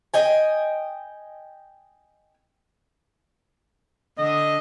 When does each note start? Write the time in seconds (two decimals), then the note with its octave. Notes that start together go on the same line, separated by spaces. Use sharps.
0.14 D#5 G5 G#5
4.18 D3 D#5